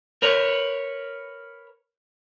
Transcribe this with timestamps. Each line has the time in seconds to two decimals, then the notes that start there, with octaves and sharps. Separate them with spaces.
0.22 A#4 B4 C#5